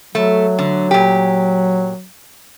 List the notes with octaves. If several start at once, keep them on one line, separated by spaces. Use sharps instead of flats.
F#3 A3
D3
A#2 G4